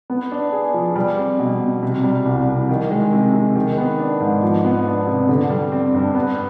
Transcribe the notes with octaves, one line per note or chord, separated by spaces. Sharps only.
B3
D4
G#4
F3
G3
C4
B2
B2
C3
G3
C2
C2
D#3
G#3
C3
C3
D#3
B3
D4
G#2
F3
B3
D4
C3
D3
G3
C4
G2
B3